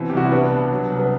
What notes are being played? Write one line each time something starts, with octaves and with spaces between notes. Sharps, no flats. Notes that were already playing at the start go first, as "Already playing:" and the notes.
Already playing: B2 E3 C4
G4
C2 F#4
E4
G3 B3 D4
B2
F#3
C2
B3